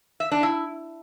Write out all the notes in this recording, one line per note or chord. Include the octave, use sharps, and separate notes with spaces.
E5
D4
E4